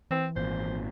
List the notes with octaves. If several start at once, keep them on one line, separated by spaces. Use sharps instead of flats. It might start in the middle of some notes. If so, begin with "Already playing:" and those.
E3 C4
G#1 A#2 C5